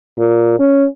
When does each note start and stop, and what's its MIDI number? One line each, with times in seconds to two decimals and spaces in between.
0.18 0.56 46
0.59 0.87 61